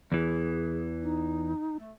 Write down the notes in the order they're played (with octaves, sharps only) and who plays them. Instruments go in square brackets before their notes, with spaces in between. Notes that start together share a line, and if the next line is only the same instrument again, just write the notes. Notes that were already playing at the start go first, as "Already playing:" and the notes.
[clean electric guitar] E2 E3 [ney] G#4
[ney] D#4
A3